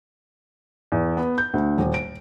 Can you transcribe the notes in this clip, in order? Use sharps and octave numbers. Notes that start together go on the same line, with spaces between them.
E2
B3
G6
D2
D#1
D7